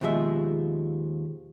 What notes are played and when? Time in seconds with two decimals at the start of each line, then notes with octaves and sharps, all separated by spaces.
0.01 D#2 B2 F3 G#3 E5